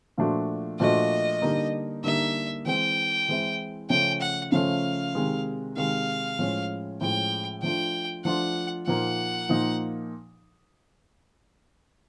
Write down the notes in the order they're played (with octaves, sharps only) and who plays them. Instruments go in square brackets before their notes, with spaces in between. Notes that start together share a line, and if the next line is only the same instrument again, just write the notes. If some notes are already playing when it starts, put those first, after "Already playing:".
[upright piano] A#2 F3 A3 D4 F#4
[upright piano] A#2 F3 A3 D4 F#4 [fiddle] D#5
[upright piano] D3 G3 A#3 D#4
[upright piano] D3 G3 A#3 D#4 [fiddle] E5
[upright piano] E3 G#3 C4 E4 [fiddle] G5
[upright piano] E3 G#3 C4 E4
[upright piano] C#3 F3 A3 C#4 [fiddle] G5
[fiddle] F#5
[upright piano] C#3 F3 A3 C#4 [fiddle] F5
[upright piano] C3 D#3 G#3
[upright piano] C3 D#3 G#3 [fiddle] F5
[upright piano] A2 F3 G#3 C#4
[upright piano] A2 F3 G#3 C#4 [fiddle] G5
[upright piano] F3 A3 D4 F4 [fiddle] G5
[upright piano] F3 A3 D4 F4 [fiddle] F#5
[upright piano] A#2 F3 A#3 D#4 [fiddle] F#5
[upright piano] A#2 F3 A#3 D#4